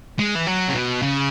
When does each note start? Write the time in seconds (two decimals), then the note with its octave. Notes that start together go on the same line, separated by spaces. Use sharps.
0.19 G#3
0.35 E3
0.47 F#3
0.69 C#3
0.74 B2
1.02 C#3